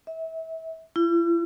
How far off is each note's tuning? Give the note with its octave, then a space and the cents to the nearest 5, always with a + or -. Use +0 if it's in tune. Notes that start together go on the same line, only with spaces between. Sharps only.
E5 -30
E4 +45